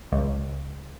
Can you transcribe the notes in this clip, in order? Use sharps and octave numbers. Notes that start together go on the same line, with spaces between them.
C#2